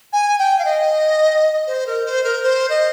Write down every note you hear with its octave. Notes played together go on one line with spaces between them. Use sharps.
G#5
G5
F5
D#5
C5
A#4
C5
A#4
C5
D#5